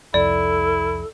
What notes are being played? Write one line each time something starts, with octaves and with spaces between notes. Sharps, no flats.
C2 F2 E4 A4 D5